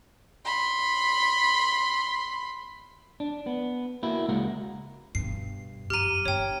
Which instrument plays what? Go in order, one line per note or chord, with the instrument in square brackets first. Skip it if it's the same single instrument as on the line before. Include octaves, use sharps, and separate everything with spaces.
[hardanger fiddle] B5 C6
[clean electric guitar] D4
B3
A#3 E4 F#4
C#2 G#3 A#3 F#4 A#4
[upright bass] G2 B2 [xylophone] C7
[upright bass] F#2 [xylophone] G4 A#5 [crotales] F6 D#7
[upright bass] G1 [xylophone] C#5 G5